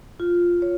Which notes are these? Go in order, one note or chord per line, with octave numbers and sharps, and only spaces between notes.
F4
C#5